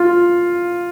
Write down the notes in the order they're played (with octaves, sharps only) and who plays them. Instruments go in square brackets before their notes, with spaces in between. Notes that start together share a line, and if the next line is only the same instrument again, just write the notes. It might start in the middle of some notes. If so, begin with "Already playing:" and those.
Already playing: [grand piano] F4